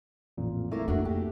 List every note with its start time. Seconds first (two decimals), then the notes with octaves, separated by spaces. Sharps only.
0.38 A1 F2 A#2
0.71 A3 A#3 E4 A#4
0.88 F2 A#3 D4 F#4
1.05 G4